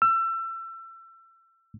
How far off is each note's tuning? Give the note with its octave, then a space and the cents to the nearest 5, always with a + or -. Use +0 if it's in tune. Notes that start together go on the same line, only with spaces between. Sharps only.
E6 +30